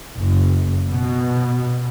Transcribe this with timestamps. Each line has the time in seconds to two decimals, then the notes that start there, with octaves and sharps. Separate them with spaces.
0.17 F#1
0.88 B2